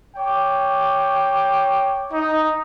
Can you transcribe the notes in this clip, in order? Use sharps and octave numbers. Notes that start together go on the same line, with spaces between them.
C#5 G5 D6
D#4